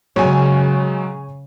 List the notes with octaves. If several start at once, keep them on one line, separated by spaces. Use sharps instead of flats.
C#3 F#3 G#3 C#5 G#5